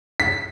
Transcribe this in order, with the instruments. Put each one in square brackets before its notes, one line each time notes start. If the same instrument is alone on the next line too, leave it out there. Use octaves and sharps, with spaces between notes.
[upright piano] B6